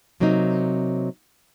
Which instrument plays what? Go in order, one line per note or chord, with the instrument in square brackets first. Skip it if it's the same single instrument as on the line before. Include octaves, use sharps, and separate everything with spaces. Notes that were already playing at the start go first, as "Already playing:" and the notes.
[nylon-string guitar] C3 F#3 A#3 C4 D#4